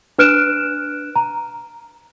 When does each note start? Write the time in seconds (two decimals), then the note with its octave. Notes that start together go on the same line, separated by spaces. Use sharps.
0.18 D4 B4 F6 F#6 D7 E7
1.16 A#5